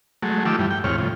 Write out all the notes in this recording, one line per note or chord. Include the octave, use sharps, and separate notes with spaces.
F#3 G#3 A3
D#3 F3 A3 G4 D6 E6
G2 E3 G3
G5
E2 G#2 C3 C#5 F6
A2 C#3 F3